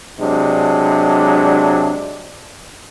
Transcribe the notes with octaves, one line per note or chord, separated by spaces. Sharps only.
C3 F#3 G#3 D4